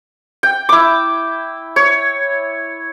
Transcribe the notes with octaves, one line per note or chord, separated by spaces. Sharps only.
G5
E4 D6
C#5